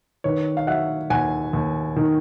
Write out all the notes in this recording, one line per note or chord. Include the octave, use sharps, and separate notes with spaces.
D#3 B4 C#5
F5
F#3 E5 F#5
D#2 F#5 G#5
D#2
D#3